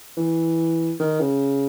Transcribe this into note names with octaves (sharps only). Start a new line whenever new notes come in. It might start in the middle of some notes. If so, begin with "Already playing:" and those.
E3
D#3
C#3